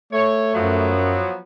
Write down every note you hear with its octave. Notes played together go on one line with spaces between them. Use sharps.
A3 C#5
F#2 F3 F#3 B3